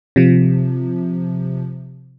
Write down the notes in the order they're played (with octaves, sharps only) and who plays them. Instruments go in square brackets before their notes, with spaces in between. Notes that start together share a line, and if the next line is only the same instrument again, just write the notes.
[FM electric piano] C3 F3